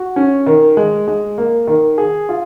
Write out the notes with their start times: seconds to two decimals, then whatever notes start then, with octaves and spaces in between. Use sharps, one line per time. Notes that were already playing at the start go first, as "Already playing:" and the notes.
Already playing: F#4
0.16 C#4
0.46 D#3
0.77 G#3
1.08 G#3
1.38 A#3
1.67 D#3
1.98 G#4
2.29 F4